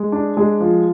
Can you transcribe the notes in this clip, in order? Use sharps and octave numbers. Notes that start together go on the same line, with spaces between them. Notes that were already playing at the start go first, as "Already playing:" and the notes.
Already playing: G#3
D4
G#3
F3